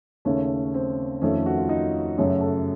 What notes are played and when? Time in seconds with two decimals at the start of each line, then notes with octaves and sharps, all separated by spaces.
0.25 D#2 C#3 A3 C#4
0.74 C4
1.22 F2 D#3 A3 C#4
1.46 F#4
1.57 F4
1.69 D#4
2.18 F#2 C#3 F#3 A3 F#4
2.41 A4